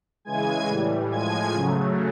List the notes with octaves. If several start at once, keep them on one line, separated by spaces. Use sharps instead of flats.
C#3 E3 G#3 G#5 G#6
A2 E3 G3
A2 F3 G#3 G#5 G#6
C#3 F#3 A3